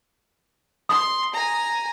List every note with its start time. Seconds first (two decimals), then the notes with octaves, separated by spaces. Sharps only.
0.89 C6 D#6
1.34 G#5 A#5